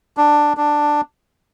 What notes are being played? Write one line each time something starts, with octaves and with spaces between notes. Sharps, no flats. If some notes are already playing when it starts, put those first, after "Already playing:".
D4
D4